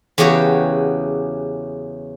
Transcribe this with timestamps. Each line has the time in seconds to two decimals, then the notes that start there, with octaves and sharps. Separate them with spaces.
0.18 E2 C#3 F#4 G4 C#5